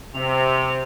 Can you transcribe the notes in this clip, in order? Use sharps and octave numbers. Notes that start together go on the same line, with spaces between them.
C3 F7